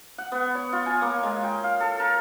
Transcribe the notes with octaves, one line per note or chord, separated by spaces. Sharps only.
F#5
B3
C#5
F4
G#5
A#3
G#3
G5
F5
A4
A#4